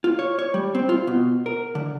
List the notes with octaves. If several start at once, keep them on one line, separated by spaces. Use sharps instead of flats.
F4
C#5
C#5
G3
C4
F4
B2
A#4
D3